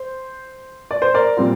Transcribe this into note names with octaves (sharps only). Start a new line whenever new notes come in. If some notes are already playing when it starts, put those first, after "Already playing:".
Already playing: C5
D5
C5
A#4 D5
A#2 G3 C4 F4